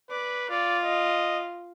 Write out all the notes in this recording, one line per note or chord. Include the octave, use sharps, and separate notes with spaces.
B4 D5
F4 D5
D#5